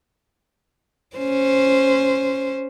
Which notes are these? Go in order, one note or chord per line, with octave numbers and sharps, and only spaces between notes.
C#4 C5